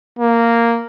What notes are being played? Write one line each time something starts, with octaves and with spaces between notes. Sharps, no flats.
A#3